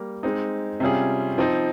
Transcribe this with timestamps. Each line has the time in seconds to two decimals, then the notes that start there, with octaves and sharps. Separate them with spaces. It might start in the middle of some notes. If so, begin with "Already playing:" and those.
Already playing: G3 A#3
0.23 G#3 C4 D#4
0.80 C3 G3 C#4 F4 G#4
1.38 F3 C4 D#4